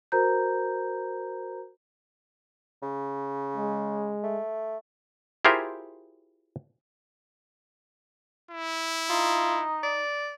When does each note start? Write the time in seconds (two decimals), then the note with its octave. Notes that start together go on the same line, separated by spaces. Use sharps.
0.12 F#4 A#4 C5 A#5 G6
2.83 C#3
3.57 G#3
4.24 A3
5.45 E4 F4 G4 G#4 A#4 C5
8.51 E4
9.10 D#4 F4
9.83 D5